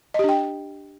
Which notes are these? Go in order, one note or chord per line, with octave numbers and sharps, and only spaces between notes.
D4 G4 D#5 G5